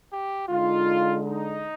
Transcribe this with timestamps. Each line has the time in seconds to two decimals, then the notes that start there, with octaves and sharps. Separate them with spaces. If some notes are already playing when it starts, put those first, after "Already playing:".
0.11 G4
0.49 D3 G#3 D#4 F4
1.26 D#4